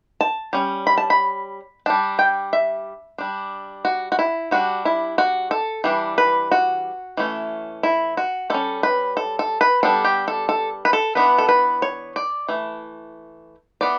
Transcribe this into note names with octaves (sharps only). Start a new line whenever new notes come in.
A5
G3 C#4
B5
A5
B5
G3 D4 A5
G5
E5
G3 D4
F#4
F#4
E4
G3 D4 F#4
E4
F#4
A4
E3 G3 D4
B4
F#4
E3 A3 C#4
E4
F#4
G3 C#4 A4
B4
A4
A4
B4
G3 B3 D4 A4
G4
A4
A4
B4
A4
E3 B3 D4 B4
A4
B4
C#5
D5
E3 A3
E3 B3 D5